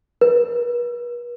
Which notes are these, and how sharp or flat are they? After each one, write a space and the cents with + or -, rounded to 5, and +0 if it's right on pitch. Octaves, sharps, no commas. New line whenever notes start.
B4 -45